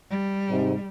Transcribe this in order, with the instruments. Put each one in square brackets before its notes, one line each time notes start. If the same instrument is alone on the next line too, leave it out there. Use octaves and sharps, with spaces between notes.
[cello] G3
[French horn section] G#2 C3